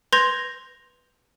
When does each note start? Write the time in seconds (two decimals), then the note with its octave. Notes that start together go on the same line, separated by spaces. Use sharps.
0.12 B4 C6 G6 G#6 A#6 F7